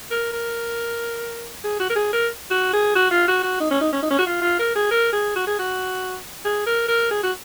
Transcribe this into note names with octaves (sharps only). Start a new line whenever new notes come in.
A#4
A#4
G#4
F#4
A#4
G#4
A#4
F#4
G#4
F#4
F4
F#4
F#4
D#4
C#4
D#4
C#4
D#4
C#4
F#4
F4
F4
A#4
G#4
A#4
G#4
F#4
G#4
F#4
G#4
A#4
A#4
G#4
F#4